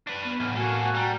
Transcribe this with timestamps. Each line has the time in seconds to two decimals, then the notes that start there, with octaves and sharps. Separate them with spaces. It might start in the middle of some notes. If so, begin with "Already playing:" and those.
0.07 D4 B4
0.25 B3
0.40 B1 E2 A2 F6
0.56 A3 A#3 F#4 A4 G#5
0.83 F#4
0.95 G3 A#5